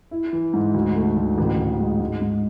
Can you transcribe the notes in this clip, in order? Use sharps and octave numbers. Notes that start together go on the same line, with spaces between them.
E4
E3
G#2
D2
A3
D2
A1
A1
G#3
G#2
G#2